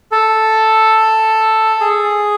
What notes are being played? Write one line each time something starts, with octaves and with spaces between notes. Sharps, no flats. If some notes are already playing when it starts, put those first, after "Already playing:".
A4
G#4